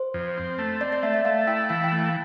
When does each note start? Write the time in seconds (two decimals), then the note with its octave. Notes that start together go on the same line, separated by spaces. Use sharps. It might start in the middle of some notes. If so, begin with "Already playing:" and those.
Already playing: C5
0.14 F2
0.37 C4
0.59 A3
0.81 C4 D5
0.92 D5
1.03 A3 E5
1.14 E5
1.25 A3 F5
1.47 E4 G5
1.69 E3 F5
1.84 G5
1.92 A3
1.99 F5